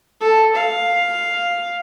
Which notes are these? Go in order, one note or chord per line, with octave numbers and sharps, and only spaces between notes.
A4
F5